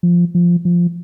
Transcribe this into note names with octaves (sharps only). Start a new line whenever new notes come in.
F3
F3
F3